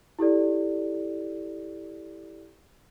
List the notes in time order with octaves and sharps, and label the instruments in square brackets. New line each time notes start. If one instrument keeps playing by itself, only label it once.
[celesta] E4 G4 A4 D5